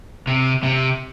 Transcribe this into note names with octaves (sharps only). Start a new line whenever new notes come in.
C3
C3